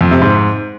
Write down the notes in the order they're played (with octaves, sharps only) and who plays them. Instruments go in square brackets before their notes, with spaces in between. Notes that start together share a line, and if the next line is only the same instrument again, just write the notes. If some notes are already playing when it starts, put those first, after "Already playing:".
[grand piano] F2
C3
G#2